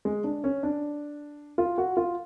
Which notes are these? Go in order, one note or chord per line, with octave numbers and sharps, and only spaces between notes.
G#3
D4
C#4
D4
F4
F#4
F4